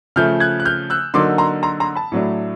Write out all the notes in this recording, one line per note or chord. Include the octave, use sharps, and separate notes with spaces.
C#3 F3 A3 F6 G6
F#6 G#6
F#6
F6 G6
E6 F#6
D3 F#3 A#3 D#4 C6 D6
A#5 C6
A#5 C6
A#5 C6
A5 B5
A2 F#3 A3 D4